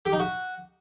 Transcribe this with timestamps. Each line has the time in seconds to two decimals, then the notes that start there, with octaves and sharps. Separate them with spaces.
0.05 G4
0.12 D#4
0.19 F#4